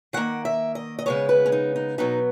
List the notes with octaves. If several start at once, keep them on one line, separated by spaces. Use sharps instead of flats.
D#3 A#3 F#5
E5
D#5
D#5
C#3 G#3 B3 C#5
B4
C#4
D#4
D#4
B2 F#3 B3 D#4